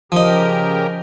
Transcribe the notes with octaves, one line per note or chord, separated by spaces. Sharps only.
C#3 F3 D#4 G4 A#4